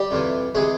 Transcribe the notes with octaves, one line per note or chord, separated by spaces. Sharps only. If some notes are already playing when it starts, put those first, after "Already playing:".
Already playing: G3 G4
F2 C3 E3
C3 E3 G#3 G#4